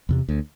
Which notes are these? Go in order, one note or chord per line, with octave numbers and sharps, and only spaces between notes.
E2 C3
D2